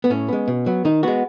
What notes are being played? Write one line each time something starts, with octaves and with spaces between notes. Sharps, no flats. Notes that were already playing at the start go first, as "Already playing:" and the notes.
B3
A2 C#4
G#3 B3
B2
F#3 B3
D#3 D#4
G#3 B3 F#4